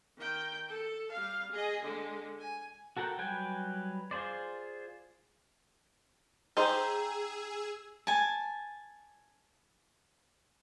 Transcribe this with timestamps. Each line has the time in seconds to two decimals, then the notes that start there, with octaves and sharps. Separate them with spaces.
0.17 D#3 G5
0.68 A4
1.11 G3 F5
1.51 G#4 D#5
1.82 D3 G#3
2.38 G#5
2.97 F#4 A4 A#4 F#5 G5
3.18 F#3 G3 B4 G5 G#5
4.11 F4 G#4 C5 D5
6.57 D#4 G4 G#4 C5 E6
8.07 G#5 A5